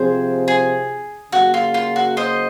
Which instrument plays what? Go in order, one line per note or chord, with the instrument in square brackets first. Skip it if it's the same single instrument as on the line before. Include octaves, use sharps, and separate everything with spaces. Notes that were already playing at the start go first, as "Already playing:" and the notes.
Already playing: [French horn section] C3 F3 C4 [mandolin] G#4 C5
[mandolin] G#4
[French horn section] C#3 F#3 A#3 [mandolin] F#4
[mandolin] F4
F4
F#4
C5 D#5